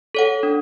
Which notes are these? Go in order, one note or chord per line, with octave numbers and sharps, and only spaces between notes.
A4 C#5 F#5
D4